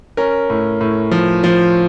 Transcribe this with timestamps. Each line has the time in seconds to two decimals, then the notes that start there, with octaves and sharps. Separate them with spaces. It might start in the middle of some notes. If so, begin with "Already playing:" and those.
0.17 C#4 A#4
0.50 A2
0.81 A2
1.11 F3
1.44 F3